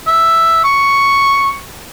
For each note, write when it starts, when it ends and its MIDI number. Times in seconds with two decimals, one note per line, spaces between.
0.07 0.63 76
0.64 1.58 85